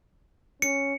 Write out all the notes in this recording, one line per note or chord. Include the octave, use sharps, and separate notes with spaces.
C#4 C#7